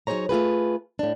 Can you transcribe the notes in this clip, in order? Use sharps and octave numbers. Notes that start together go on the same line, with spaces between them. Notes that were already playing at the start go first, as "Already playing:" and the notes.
F#3 D#4 G#4 C5 C#5 A#5
A3 F4 G#4 B4
A2 D4